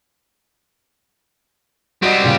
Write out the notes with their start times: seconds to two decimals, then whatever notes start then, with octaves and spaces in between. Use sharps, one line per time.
2.02 G3 C4 F#4 D#5
2.23 A#2 C#3 F5